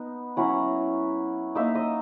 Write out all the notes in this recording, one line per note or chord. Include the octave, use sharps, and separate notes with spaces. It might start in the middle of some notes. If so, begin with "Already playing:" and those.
Already playing: B3 D#4
F#3 C#4 E4 F#5
A#3 D#4 E5
D#5